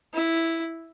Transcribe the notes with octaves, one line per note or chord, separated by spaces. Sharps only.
E4